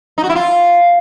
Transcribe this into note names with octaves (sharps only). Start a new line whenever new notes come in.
D#4
F#4
E4
F4